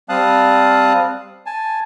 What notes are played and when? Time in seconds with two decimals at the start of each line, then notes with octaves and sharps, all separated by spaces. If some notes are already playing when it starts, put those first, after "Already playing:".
0.09 G3 C4 F5 A5 D#6 F#6
1.46 G#5 A5